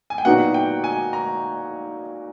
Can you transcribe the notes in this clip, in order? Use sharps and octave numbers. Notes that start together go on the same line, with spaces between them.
G#5
G5
A#2 F#3 B3 D#4 F#4 F#5
G5
G#5
A#5